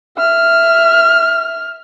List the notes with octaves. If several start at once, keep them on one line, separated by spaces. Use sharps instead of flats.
E5 F6